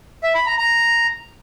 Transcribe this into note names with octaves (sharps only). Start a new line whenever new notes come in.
E5
B5
A#5
A#5